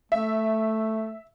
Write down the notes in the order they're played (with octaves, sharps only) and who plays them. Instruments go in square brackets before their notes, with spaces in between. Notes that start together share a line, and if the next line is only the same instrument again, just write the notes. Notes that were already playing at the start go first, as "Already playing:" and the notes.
[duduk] A3 [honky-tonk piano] E5